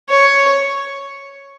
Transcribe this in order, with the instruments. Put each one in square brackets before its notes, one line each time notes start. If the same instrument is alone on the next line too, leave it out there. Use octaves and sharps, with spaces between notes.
[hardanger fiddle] C#5